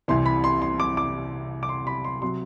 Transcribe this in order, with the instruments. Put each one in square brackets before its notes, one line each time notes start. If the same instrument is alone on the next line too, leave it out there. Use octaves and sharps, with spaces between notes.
[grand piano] C2 C3 E3 C6
B5
C6
C6
D6
D6
D6
C6
B5
C6
C3 F#3 C6